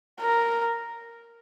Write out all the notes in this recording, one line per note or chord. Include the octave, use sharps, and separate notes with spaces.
A#4